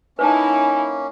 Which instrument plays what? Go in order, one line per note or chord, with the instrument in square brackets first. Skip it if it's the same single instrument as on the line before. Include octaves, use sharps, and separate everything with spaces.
[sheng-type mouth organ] A#3 C#4 [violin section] D#4 E4 [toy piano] B4 C#5 A5 [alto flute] G#5